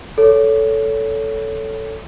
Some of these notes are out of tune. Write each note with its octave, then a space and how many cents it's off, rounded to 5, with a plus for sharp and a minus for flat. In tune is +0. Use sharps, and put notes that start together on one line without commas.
A4 +0 C#5 +20